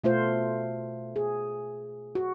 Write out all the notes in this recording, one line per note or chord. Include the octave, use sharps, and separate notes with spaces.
B2 A3 F4 C5
G#4
F#4